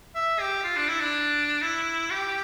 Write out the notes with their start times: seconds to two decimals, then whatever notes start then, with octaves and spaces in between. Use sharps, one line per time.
0.16 E5
0.40 G4
0.64 F4
0.77 D4
0.89 E4
1.01 D4
1.62 E4
2.11 G4